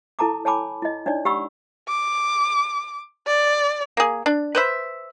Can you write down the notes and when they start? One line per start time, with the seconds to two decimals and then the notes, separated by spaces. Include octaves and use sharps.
0.19 E4 A4 A5 A#5 D6
0.45 C#5 G#5 A5 B5 D6
0.82 E4 D#5
1.06 D4 D#4 C#5 D5
1.25 G4 F#5 B5 C#6 E6
1.89 D6
3.27 D5
3.97 A#3 G#4
4.26 D4
4.55 B4 C5 E5